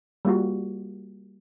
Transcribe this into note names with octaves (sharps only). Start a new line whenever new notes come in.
G3 A#3 F4 F#4